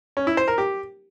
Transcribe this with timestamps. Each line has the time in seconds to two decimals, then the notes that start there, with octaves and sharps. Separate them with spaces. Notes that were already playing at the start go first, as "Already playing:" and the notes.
0.17 C#4
0.27 E4
0.37 C5
0.48 A#4
0.58 G4